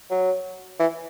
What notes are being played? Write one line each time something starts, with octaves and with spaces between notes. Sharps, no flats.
F#3
E3